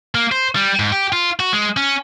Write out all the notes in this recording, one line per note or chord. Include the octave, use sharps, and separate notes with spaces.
A#3
C5
G3
G#2
G4
F4
F#4
G#3
C#4